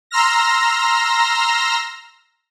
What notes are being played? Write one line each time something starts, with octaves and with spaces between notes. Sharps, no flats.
A#5 C6 E6 F6 A#6